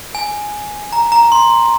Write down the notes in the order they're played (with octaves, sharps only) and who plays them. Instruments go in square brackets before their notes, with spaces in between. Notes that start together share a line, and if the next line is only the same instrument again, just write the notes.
[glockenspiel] G#5
A#5
A#5
C6